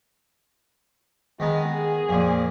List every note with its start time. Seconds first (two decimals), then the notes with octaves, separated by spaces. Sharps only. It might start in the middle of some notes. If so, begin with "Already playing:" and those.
1.40 D#3 G#3 B3 A#5
1.69 G#4
2.09 F2 A#2